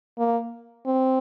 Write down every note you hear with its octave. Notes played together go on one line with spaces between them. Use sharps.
A#3
C4